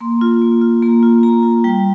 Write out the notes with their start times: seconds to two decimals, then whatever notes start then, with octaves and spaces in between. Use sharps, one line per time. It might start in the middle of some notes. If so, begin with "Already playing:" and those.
0.01 A#3 C6
0.21 F4
0.42 A#3
0.61 F4
0.82 A#3 A#5
1.03 F4
1.23 A#3 A#5
1.43 F4
1.64 G3 G5